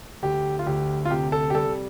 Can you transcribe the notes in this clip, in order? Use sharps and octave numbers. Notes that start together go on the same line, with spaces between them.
D2 G4
F4
D2 G4
F4
C3 G4
A4
G4
G3 A4